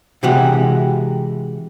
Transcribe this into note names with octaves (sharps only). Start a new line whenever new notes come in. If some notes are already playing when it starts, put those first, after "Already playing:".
C3 E3 G#3 F#4 G4